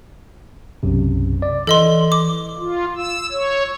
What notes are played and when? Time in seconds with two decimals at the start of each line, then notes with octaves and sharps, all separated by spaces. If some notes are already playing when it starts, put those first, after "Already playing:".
0.83 B1 F#2 C3
1.42 D5
1.67 E3 A4 D#5 C6
2.12 D6
2.58 F4
2.97 E6
3.32 C#5